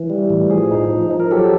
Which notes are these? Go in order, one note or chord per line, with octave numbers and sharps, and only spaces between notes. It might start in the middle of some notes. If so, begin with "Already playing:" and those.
Already playing: E3
G3
A2
F3 G#4
D#4
F3
F3
A#4
F#3 G4 A4